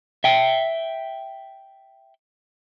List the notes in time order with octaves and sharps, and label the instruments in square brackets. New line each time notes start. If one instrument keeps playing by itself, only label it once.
[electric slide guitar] E5 G5